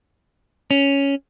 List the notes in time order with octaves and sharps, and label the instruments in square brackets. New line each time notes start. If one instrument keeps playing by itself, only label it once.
[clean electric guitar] C#4